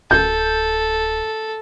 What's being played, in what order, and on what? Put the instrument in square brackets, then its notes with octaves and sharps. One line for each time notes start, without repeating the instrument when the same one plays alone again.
[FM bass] D1 [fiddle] A4 [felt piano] G6